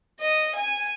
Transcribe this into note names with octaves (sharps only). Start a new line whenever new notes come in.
D#5
G#5